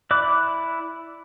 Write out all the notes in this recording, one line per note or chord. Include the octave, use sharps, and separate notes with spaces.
E4 D5 D6 F#6